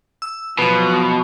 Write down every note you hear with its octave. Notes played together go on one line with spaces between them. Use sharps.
E6
B2 F3 F#3 B3